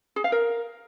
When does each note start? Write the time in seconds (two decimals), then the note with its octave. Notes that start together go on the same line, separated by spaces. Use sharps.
0.16 G#4
0.24 F5
0.32 A#4